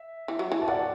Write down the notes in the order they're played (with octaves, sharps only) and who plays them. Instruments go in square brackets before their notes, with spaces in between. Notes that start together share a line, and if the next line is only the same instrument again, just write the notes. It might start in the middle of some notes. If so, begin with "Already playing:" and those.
Already playing: [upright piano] E5
[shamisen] E3
F#3
E3
[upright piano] A5
[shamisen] F#3 [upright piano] D5 F#5